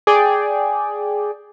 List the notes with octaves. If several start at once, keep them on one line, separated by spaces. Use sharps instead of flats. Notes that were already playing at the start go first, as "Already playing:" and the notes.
G#4 D5 G5